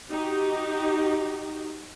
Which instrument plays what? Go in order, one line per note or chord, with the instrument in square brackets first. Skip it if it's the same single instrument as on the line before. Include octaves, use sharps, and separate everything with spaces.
[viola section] D#4 F#4 G4